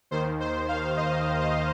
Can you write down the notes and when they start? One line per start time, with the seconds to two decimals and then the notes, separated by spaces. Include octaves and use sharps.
0.11 D#2 D#3 C5
0.40 C5
0.68 F5
0.97 D#5
1.41 D#5